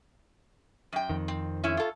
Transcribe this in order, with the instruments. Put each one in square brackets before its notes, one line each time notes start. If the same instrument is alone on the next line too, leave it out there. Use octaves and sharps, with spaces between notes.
[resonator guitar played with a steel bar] F#2 G5
[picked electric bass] F2 D#3
[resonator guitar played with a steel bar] C4
G#3 C#4 E4
F4 A4